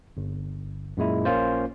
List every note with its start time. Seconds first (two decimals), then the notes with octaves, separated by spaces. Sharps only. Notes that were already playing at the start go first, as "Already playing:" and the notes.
0.17 G1
0.97 F#2 A#2 G#3 E4
1.25 A#1 A#3 C#4 F4 C5